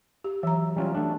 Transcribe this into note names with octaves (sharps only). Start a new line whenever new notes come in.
G4
E3 F#3 E5 A#5
G3 C#4 F4
A3 D4